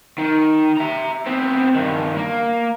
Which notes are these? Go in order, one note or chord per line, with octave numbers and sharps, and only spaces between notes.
D#3
E5 A#5
B3 C4
G2 D#3
A#3